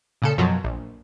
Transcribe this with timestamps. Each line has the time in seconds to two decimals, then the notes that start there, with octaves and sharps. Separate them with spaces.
0.22 A#2 C#3 A4
0.38 F#2 B2 F3 F#3
0.64 A#1